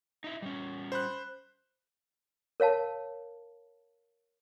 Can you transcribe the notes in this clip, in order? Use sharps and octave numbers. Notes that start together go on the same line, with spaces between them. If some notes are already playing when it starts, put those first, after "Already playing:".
D#4 E4
G3 C#4
C5 B5 F#6
A#4 C#5 F5 A5